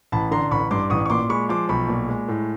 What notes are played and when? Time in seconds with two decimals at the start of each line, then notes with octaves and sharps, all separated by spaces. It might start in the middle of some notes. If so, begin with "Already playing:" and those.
0.12 A1 A5 B5
0.31 D3 A#5 C6
0.51 A1 B5 C#6
0.71 G2 C6 D6
0.90 A1 C#6 D#6
1.06 C#6
1.10 A#2 C6 D6
1.29 G#3 B5 C#6
1.49 F3 C6 D6
1.69 B1 B5 C#6
1.88 A#2
2.08 G#3
2.28 A2